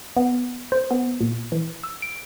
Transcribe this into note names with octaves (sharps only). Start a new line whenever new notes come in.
B3
C5
B3
A#2
E3
E6
D7